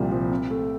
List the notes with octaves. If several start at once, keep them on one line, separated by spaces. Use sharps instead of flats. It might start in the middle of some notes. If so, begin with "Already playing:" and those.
Already playing: C2 A#2 F3 G3
F3
C4
A3